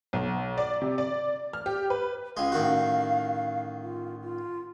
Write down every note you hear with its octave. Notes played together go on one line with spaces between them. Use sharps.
B1
D5
C3
D5
F6
G4
B4
C#2 G#3 F5
A1 D#3 F#4
F4
F4